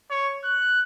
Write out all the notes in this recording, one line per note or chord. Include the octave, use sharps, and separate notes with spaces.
C#5
F#6